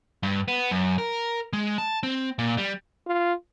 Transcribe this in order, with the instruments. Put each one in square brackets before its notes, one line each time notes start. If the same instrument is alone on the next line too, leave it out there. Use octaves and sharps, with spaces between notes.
[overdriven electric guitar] G2
B3
F#2
A#4
G#3
A5
C4
A#2
G3
[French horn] F4